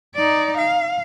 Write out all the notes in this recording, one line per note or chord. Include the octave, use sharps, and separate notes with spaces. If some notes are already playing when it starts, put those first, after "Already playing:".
D#4 D5
F5